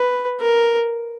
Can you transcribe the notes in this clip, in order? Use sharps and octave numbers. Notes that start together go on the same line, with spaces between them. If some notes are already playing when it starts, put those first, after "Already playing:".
Already playing: B4
A#4